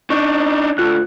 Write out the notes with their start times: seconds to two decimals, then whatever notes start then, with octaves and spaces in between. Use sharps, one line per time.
0.10 D4 D#4 C#6
0.78 D2 F4 F#6